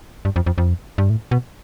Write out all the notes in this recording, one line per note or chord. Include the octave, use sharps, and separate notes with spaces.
G2
F2
F2
F2
G2
A2
B2